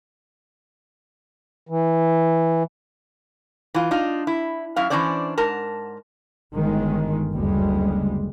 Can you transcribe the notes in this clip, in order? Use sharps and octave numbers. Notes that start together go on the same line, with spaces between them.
E3
E3 F4
D4 D#4 F4
E4
F#2 E4 F5
E3 G#3 C#4 D4 C5 D5
G#2 A#4 A5
G1 D#3 G#3
F#1 D2 G3 G#3